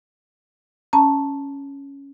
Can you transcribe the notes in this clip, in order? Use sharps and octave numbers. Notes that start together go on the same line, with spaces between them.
C#4 A5 A#5